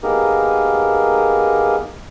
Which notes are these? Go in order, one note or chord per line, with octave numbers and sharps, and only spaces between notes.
A#3 B3 D#4 G4 G#4 A#4